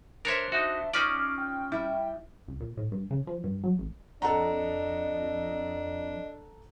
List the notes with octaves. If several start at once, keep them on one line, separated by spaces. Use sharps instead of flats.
D4 A#4 C5 C#5 E5
D#4 F#4 E5
C#4 D#4 F4 D5 D6
G5
G3 E4
C#2
A#2
A2
G2
C#3
F3
G2
F#3
A1
F2 D4 A4 D#5 F#5 A#5